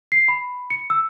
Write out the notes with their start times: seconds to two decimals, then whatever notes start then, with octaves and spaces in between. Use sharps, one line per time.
0.12 C7
0.28 B5
0.70 C#7
0.90 E6